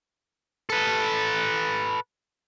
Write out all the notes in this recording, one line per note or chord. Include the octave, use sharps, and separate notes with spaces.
A4 B4